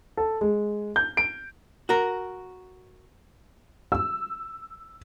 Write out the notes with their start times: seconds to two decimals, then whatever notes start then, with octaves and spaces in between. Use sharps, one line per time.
0.17 A4
0.41 G#3
0.96 G6
1.17 D7
1.89 F#4 A#4
3.92 E6